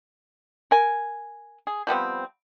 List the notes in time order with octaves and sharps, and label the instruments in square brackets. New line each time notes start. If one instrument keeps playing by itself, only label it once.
[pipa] A#4 G#5
G#4
F3 G3 B3 C4